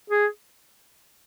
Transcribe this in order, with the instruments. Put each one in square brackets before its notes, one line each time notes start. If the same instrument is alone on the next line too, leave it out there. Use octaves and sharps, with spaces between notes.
[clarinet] G#4